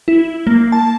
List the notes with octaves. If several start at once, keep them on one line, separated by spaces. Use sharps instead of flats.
E4
A#3
A5